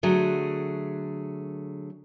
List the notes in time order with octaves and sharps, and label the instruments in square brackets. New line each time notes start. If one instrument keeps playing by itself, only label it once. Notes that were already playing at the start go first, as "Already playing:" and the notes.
[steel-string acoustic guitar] D3 F#3 A3 G#4